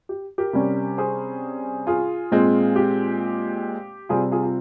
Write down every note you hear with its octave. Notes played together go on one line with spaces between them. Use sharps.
G4
G4 A#4
C3 G3 C#4
G#4 C5
F4 G#4
A#2 G#3 C4
G4
C3 G3 C4 F4 G#4
F4 G#4
F4